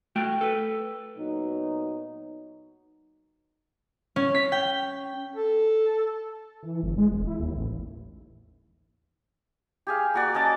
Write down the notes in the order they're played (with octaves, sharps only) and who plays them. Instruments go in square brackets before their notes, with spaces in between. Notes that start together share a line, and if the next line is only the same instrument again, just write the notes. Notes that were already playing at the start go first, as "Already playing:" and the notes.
[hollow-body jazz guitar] A3 F#4 G5
A4 B4
[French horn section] A#2 F#3 B3 D#4
[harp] C#4
B6
G5
[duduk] A4
[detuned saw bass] E3
G1
G#3
E1
E4
D#2
A1
[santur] G4 G#4 F5
A#3 F#4 D5
C#4 D#5 A5 D6